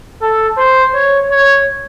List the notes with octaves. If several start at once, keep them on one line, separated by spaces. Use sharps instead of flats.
A4
C5
C#5
C#5